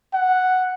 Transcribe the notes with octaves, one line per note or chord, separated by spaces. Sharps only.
F#5